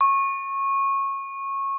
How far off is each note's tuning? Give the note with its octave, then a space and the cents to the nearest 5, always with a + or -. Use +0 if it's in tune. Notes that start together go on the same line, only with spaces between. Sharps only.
C#6 -20